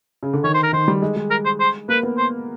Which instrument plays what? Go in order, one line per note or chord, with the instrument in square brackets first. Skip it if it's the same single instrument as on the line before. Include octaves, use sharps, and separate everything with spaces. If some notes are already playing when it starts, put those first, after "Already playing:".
[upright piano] C#3
D3
[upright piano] D#3 [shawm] C#5
[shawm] C5
A#4
[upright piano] D#3 [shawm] C5
[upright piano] G3
G#3
G#3
[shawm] A#4
C5
C5
[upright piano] A#3 [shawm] B4
[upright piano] B3
[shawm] C5